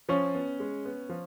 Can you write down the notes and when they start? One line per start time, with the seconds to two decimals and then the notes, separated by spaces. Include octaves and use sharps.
0.09 F3 C#4
0.35 B3
0.60 G#3
0.85 B3
1.09 F3